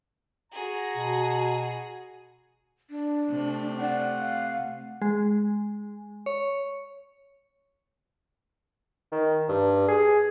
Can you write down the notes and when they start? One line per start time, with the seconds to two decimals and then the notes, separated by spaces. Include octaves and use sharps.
0.52 F#4 G#4 A#5
0.97 B2
2.90 D4
3.30 C3 A3
3.78 D5 F#5
4.20 F5
5.02 G#3
6.26 C#5
9.12 D#3
9.49 G2
9.88 G#4